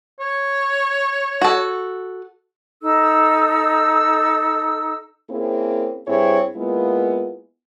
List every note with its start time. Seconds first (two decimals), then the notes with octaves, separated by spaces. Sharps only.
0.20 C#5
1.41 F#4 A4
2.81 D#4 A4 E6
5.30 A#3 C4 C#4 E4 G#4
6.07 G2 C4 E4 G#4 C#5
6.56 G#3 A#3 B3 E4 F4